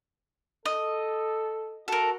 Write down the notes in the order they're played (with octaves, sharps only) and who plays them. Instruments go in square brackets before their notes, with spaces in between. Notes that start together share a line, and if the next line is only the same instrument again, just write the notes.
[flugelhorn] A4 [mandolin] D#5
[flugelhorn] F#4 [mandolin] A4 A#4